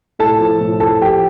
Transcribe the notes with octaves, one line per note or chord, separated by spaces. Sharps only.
A2 A4 A5
F3
A2
F3 A4 A5
F3 G4 G5